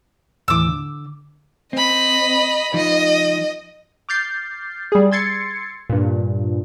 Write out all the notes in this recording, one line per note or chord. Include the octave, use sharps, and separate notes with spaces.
D#2 A2 E3 D6 E6
D3
C4 D#5 B5
F3 D#4 D#5
D6 F6 G6 A6 C7
G3 G#4
C6 E6 G#6 A6 C7 C#7
G2 A#2